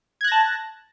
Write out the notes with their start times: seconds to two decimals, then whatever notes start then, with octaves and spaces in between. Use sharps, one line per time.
0.21 G#6
0.24 F#6
0.28 A#6
0.32 A5